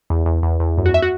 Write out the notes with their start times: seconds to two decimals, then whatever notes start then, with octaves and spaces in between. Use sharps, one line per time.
0.10 E2
0.26 E2
0.43 E2
0.60 E2
0.78 F#2
0.86 F#4
0.94 E5
1.02 F#4